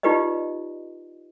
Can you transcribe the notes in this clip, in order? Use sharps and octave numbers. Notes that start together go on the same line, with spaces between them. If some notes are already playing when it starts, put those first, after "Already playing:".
D#4 F4 G4 B4 D5 D#5